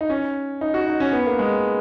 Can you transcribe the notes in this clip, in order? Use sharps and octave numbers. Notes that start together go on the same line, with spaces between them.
D#4
C#4
D#4
F#4
D#4
C#4
B3
A#3
G#3